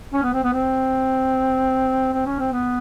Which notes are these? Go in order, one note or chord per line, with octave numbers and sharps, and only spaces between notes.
C#4
B3
C4
B3
C4
C4
C#4
C4
B3